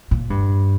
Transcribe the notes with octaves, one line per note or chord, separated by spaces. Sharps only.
A#2
G2